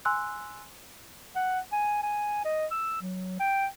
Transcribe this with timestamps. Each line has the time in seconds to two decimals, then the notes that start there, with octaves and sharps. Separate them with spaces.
0.05 G#5 C6 E6 F#6
1.36 F#5
1.72 G#5
2.03 G#5
2.45 D#5
2.71 E6
3.02 F#3
3.40 G5